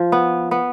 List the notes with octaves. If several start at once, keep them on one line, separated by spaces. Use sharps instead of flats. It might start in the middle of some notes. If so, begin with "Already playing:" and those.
Already playing: F3
B3
B3